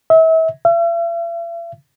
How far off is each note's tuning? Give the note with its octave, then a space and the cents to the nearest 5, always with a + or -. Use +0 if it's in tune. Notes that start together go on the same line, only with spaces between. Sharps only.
E5 -35
E5 +45